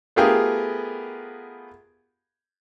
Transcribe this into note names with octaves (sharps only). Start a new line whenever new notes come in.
A3 B3 F4 G4 G#4 A#4